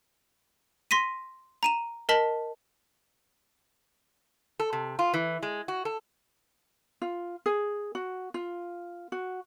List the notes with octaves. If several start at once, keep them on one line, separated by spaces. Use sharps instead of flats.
C6 A#6 B6 D#7
A#5 D#7 E7
A#4 D#5 A5 B6 F#7
A4
C3
F4
E3
G#3
F#4
A4
F4
G#4
F#4
F4
F#4